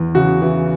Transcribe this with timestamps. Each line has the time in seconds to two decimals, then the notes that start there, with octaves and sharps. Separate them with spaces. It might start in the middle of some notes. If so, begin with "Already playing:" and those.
Already playing: E2
0.15 C#3 F#4
0.42 E3